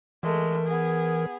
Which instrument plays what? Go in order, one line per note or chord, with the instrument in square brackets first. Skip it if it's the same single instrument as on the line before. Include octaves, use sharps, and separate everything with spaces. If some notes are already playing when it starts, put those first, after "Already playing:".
[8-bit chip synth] E3 A#4 [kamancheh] G#3 A3
[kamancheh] B3 G#4